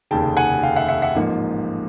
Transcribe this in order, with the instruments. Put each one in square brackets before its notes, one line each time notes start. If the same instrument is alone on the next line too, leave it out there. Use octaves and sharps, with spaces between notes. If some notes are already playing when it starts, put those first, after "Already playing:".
[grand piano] F1 D#2 C#3 G5 A5
F#5 G#5
F5 G5
E5 F#5
E5 F#5
E5 F#5
A1 G#2 F3 A#3 D#4